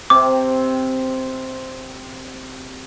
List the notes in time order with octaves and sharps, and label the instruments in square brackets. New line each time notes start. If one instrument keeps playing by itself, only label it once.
[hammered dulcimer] C3 C4 [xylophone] D6